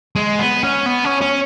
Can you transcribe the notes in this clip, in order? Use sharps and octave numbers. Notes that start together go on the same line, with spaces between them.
G#3
B3
C#4
B3
C#4
C#4